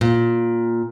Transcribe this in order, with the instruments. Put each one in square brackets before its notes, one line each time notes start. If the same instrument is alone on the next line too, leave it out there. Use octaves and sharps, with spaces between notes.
[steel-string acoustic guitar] A#2